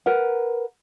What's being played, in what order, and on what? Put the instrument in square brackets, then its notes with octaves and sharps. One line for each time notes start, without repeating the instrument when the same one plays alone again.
[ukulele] A#4 B4 F#5